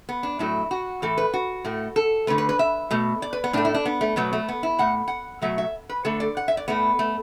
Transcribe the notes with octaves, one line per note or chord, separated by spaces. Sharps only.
B3
D4
A2 F#3 A3 E4
F#4
A2 E3 A3 A4
B4
F#4
A2 A3
A4
D3 A3 B4
B4
B4
E5
B2 A3
D5
B4
B3
A2 A3 D4
E4
D4
B3
A3
B2 F#3 A3 B3
A3
B3
E4
A2 A3 F#5
F#5
B2 F#3 A3 E5
E5
B4
D3 A3 A4
D5
F#5
E5
D5
A2 A3 B3
A3